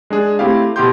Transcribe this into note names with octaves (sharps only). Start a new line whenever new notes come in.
G#3 D4 G#4
A3 C4 E4 G4 F5
B2 E4 F#4 G4 C6 G6